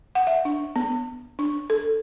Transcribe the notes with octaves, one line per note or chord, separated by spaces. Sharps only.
F#5
E5
D4
B3
D4
A4